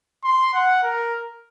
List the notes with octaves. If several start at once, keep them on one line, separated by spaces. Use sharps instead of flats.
C6
F#5
A#4